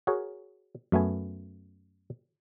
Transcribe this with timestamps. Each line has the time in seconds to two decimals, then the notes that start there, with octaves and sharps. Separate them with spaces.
0.07 F#4 G#4 A#4 C#5
0.92 F#2 A3 B3 G#5